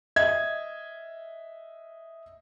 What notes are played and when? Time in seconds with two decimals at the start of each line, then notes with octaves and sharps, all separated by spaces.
0.16 D#5 E5 G#6